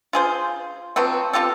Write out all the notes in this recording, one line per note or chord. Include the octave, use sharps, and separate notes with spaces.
F4 G#4 C5
F3 F#3 B3 C4
C4 F4 G4 A4